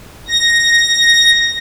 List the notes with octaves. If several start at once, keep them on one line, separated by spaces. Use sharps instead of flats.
A#6